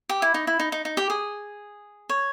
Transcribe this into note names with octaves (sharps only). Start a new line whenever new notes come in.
G4
E4
D#4
E4
D#4
D#4
D#4
G4
G#4
C#5